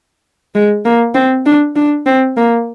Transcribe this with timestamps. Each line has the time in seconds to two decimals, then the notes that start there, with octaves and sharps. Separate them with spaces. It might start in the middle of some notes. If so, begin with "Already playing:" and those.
0.55 G#3
0.85 A#3
1.15 C4
1.46 D4
1.76 D4
2.06 C4
2.37 A#3